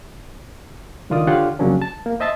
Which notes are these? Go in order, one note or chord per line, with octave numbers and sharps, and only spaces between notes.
C#2 D3 D#3 F4 D5 D#6
D3 F4 G4 C#5 F#5
F2 C#3 F#3 A#3 C#4 D4
A5
A#3
C5 D#5 E5 A5 C6 A6